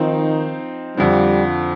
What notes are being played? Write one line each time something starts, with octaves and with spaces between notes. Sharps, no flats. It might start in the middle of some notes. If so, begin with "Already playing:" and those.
Already playing: D#3 F3 C4 D#4
F2 D3 F3 G3